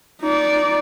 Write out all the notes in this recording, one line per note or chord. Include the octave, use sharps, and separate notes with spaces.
D#4 D5